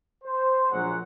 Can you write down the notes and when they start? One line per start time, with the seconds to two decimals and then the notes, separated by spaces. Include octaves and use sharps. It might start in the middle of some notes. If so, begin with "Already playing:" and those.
0.24 C5
0.71 A#1 F#3 G#3 F#5